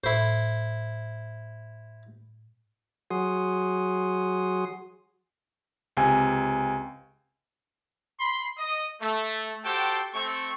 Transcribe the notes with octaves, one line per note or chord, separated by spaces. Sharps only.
A2 E4 C5
F#3 F#4 G#4 C6 D#6
C#2 C3 G#5
B5 C6
D#5 D#6
A3
F#4 G4 A4 C5 G5 A5
A3 C4 C#6